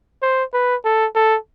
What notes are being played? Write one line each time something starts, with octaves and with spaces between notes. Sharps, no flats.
C5
B4
A4
A4